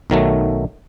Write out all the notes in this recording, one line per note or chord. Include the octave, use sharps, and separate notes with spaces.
B1 D#3 F#3 A3